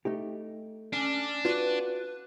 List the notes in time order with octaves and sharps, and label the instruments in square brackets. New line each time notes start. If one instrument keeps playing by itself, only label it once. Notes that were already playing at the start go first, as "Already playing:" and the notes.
[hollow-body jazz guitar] A3 D#4 G4
[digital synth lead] C#4 [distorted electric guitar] D4
[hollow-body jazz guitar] F4 F#4 D5 [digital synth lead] B4